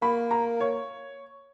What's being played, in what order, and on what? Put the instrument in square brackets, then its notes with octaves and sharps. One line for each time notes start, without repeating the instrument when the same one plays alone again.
[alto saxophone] A#3 [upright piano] B5
[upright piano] A#5
C#5